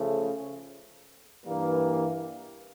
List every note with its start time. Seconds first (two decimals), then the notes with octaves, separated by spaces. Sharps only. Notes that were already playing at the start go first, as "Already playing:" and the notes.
Already playing: C#3 F3 A3
1.45 G2 E3 G3 A#3